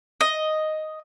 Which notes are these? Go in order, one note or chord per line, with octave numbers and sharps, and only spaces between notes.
D#5